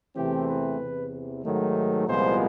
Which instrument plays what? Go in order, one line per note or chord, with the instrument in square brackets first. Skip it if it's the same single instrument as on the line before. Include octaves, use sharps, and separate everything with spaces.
[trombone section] E2 C3 E3 A3 C4 G4
B4
E2 C3 E3
G#2 D#3 F#3 A3
C2 A#2 F3 G#3 B3 C5